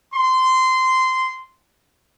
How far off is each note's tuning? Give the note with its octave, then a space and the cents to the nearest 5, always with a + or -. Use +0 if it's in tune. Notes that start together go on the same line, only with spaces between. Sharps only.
C6 -15